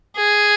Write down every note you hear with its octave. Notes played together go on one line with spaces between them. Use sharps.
G#4